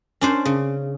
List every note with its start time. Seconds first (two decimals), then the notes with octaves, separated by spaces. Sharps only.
0.21 C#4 D4 C5
0.45 C#3